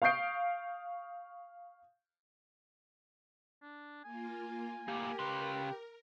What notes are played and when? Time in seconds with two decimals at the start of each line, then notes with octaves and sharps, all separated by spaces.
0.02 F5 C#6 D#6 G6 C7 D7
3.62 D4
4.04 A#3 F4 G#5
4.88 A2 A#3 G4 A#4
5.19 C#3 B4 C6